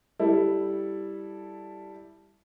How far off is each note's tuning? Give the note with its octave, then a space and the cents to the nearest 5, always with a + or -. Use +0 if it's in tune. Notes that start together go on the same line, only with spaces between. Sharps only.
G3 +0 E4 +0 A4 +0